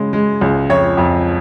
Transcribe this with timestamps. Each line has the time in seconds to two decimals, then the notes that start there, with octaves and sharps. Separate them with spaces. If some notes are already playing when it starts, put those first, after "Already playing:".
Already playing: C#3 G#3
0.13 G#3
0.41 C#2
0.69 F2 C#5
0.97 F2